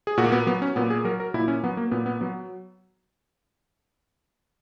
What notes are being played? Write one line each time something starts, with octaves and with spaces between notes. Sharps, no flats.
G#4
A#2 F#4
A#3
B3
F#3 B3
C#4
A#2 B3
G#4
F#3 A#4
A#4
A#2 E4
C#4
F#3 B3
A#3
A#2 B3
B3
F#3 B3